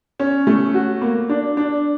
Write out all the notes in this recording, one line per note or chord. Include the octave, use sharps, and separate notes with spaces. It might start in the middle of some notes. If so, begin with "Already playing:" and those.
C#4
A3
F#4
A#3
D4
D4